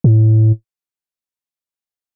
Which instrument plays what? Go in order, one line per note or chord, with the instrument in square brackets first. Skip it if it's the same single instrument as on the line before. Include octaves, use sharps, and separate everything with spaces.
[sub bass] A2